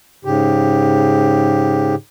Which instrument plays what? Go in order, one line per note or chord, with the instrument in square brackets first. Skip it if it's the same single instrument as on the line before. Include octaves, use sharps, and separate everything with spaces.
[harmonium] G#2 C#3 G4